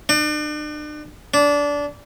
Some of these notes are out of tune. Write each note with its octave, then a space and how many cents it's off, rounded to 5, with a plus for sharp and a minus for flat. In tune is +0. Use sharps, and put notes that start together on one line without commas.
D4 +40
D4 -20